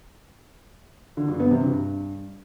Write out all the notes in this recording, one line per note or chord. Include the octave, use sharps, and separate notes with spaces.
D3
G2
B3
C3
G2